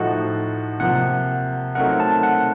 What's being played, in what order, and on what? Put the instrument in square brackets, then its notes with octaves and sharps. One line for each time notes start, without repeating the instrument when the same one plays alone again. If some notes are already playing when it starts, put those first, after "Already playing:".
Already playing: [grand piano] A2 F3 A3 D#4 F#4 [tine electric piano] F#5
[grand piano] C3 F3 A#3 [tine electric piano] F#5
[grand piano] F#3 A3 C4 D#4 A#4 [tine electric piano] F#5
[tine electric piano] A5
F#5